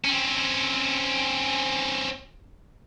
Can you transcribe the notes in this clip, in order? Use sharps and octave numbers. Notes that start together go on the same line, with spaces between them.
C4 C#4